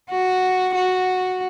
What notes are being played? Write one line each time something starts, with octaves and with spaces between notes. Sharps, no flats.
F#4
F#4